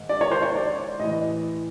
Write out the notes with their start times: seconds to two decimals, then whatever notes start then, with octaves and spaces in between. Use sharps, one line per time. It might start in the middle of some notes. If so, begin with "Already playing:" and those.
Already playing: G#2 D#3
0.09 D5
0.21 C#5
0.32 C5
0.43 C#5
0.56 D5
1.00 A2 E3 D#5